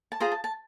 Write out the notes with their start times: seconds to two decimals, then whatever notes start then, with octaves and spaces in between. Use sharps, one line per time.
0.12 A5
0.20 F4 G#4 C5 A#5
0.32 A5
0.44 A5